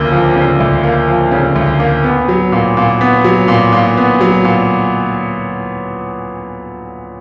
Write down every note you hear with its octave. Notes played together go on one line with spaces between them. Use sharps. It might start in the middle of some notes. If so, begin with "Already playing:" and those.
Already playing: D2 C#3 F3 A#3
F3
C#3
D2
A#3
F3
C#3
D2
A#3
B3
F#3
A#2
A#2
B3
F#3
A#2
A#2
B3
F#3
A#2